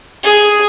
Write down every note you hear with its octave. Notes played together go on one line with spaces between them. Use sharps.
G#4